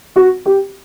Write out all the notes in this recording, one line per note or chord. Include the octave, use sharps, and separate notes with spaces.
F#4
G4